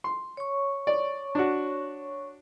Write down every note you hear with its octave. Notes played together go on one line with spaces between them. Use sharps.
C6
C#5 C#6
D5
D4 F#4